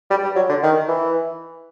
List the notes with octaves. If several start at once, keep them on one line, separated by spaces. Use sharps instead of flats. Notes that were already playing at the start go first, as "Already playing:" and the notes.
G3
G3
F#3
D3
D#3
E3